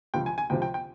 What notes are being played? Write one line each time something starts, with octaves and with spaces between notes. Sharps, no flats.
C#2 C3 F3 G5
G#5
G#5
C#2 C3 F3 G5
G5
G5